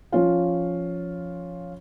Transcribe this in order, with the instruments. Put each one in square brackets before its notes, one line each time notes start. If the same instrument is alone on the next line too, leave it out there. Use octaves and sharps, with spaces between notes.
[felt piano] F3 C#4 F4